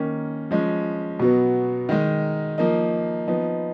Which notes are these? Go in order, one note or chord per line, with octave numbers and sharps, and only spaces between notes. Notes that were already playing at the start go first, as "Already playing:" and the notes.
Already playing: D#3 A#3 C#4
F3 G#3 C#4
B2 F#3 B3
D#3 G#3 D#4
F3 A#3 D#4
F3 B3 D#4